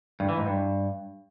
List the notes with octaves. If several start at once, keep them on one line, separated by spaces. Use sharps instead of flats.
G2
E3
G#2
G2